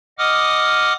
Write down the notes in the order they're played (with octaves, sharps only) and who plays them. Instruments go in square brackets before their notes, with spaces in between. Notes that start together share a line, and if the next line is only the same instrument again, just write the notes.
[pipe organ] D#5 F#5 D6 D#6 F6